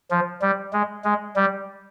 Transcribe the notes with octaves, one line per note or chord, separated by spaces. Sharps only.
F3
G3
G#3
G#3
G3